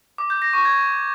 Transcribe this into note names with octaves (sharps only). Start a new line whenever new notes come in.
D6
G6
A#6
C#6
G#6